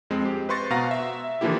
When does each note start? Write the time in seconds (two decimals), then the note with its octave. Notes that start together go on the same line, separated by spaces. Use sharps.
0.10 F2 G#3 C4
0.25 G4
0.49 B4 C5 C6 C#6 A6 A#6
0.70 B2 F5 F#5 A#5 A#6
0.91 E5
1.41 D3 E3 F3 A#3 E4 G4